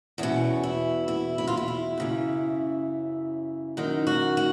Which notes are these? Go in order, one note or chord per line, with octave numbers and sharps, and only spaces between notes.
E2 B2 C#4
E4
E4
E4
F4
E4
E4
F#2 C#3 E3
F#2 D#3 D#4
F#4
F#4